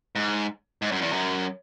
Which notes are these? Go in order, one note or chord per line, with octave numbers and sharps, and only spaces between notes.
G#2
G#2
F#2
E2
F#2